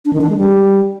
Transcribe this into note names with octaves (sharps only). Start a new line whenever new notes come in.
D4
D#3
D4
G#3
G3